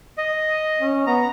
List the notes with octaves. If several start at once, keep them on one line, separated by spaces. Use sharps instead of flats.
D#5
C#4
B3 A#5